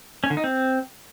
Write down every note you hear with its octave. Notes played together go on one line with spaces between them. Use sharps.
C#4
D3
D#4
C4